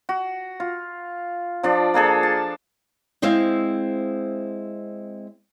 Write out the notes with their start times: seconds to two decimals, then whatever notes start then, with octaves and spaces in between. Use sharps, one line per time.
0.09 F#4
0.60 F4
1.63 F3 D4 D5
1.94 A#3 D4 G#4 A4
2.23 A5
3.22 G#3 C4 E4 C5 E5 F5